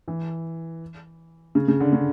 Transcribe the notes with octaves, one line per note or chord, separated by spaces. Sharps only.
E3
C#3
C#3
D3
C#3